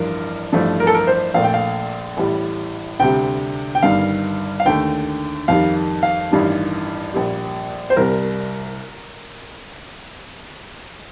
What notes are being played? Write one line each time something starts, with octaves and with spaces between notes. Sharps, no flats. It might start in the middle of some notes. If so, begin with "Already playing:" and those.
Already playing: A1 G2 F3 A#4
A1 G2 F3 A3
A#4
A4
A#4
C5
A#1 A#2 A3 F5
G5
F5
A1 A2 G3
D2 C3 G3 G5
G5
G1 G2 D#3 F5
F5
D#2 D3 A3 G5
F2 D#3 G3 F5
F5
A1 G2 D#3 G3
A#1 A#2 G3
C5
C2 C3 G3 A#4